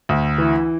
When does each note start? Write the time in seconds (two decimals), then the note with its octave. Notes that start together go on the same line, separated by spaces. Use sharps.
0.09 D2
0.38 E3